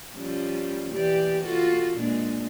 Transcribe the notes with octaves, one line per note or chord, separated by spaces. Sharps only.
F3 G3 C#4
E3 G4 D5
F4 F#4 A4
A#2 G#3 D4